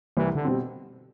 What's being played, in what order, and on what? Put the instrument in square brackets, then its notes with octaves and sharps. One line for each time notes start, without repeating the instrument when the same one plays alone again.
[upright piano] C2 [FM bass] E3
[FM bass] D3
[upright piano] B2 G3 C4